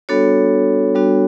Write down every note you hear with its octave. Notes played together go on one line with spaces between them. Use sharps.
G3 B3 D4 F#4 A4 C#5
G3 B3 D4 F#4